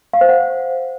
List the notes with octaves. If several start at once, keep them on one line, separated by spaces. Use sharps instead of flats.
F5
C5
F#5